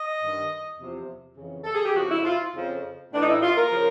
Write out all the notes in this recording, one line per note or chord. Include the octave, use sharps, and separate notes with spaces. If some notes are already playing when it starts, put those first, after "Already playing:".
Already playing: D#5
G2 D#3
E2 C3 F3
F2 C#3 E3
A4
G#4
G4
F2 C#3 F3 F#4
E4
F4
F2 C#3 F3
A2 E3 D4
D#4
E4
F4
A#4
C#3 F3